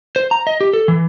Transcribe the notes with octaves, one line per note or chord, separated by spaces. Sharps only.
C5
A#5
D#5
G4
A4
E3